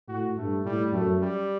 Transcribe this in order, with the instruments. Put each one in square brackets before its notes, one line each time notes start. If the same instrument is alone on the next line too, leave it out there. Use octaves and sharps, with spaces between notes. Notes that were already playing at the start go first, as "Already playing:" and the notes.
[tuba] A2 [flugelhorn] F#4
[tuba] G2 [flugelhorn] A3
[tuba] A2 [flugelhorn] G3
[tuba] F#2 [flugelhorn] A3
[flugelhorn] G3